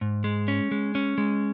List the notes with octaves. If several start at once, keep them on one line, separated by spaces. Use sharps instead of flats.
G#2
G#3
C#4
G#3
C#4
G#3